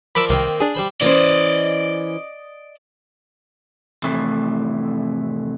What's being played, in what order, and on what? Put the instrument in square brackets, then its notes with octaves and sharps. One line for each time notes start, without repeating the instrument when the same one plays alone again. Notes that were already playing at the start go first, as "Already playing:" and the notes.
[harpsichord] F3 A#4 D5 [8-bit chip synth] B5 D6 E6
[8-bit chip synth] C2 [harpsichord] D#3 A#3 C4
[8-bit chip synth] D4 G#4
[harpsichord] G3 C5 B5
[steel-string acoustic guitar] E3 C#4 C5 [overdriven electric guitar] D5 D#5
[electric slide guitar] F2 A2 C3 E3 A3